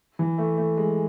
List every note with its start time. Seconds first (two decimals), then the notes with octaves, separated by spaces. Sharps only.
0.19 E3
0.38 A3
0.58 A3
0.77 G#3